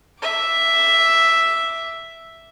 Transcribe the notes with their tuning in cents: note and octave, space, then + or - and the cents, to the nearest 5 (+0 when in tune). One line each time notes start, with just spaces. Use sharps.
E5 +0 D6 -5